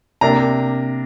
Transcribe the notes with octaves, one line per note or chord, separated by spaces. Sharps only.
C3 A#3 D4 A#5